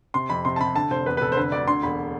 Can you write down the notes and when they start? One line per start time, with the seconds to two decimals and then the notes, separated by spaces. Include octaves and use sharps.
0.14 C3 C6
0.30 F2 B5
0.45 C3 C6
0.56 A5
0.60 C3 B5
0.75 D3 A5
0.91 F1 C5
1.06 E2 B4
1.17 B4
1.21 F1 A4
1.32 C5
1.36 D3 B4
1.52 D2 D5
1.68 D3 C6
1.83 E1 B5